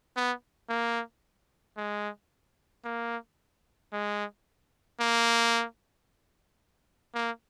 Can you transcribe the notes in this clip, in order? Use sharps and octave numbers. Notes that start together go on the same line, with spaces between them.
B3
A#3
G#3
A#3
G#3
A#3
A#3